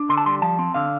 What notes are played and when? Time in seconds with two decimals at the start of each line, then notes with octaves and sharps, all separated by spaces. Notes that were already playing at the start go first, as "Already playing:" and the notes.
Already playing: D4
0.09 D3 C6
0.17 A5
0.26 G3 C6
0.42 F3 A5
0.59 C4
0.74 D3 F5